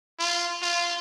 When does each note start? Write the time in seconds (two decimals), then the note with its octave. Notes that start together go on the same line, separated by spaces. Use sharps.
0.19 F4
0.62 F4